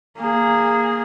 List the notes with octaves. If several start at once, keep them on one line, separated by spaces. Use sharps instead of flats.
A#3 G#4